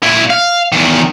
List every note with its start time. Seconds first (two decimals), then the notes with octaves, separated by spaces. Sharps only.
0.03 A#2 E4
0.30 F5
0.72 E2 D#3